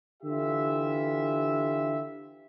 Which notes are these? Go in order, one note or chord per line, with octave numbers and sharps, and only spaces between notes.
D3 E3 F4 G4 E5